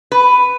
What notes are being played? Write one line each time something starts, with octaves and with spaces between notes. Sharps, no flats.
B4